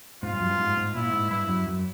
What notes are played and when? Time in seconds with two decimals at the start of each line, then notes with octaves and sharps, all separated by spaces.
0.23 G#2 F4
0.33 G2
0.41 F#2
0.50 G2
0.59 G#2
0.77 G#2
0.95 A#2 E4
1.12 G#2
1.30 G2 E4
1.49 F#2
1.67 F#2